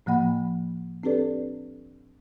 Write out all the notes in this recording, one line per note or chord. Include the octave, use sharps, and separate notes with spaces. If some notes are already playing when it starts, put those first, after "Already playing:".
A2 F3 A#3 F#5 B5
C4 D4 G4 A4 B4 D5